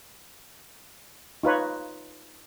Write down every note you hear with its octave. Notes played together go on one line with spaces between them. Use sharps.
D#4 F4 B4 C#5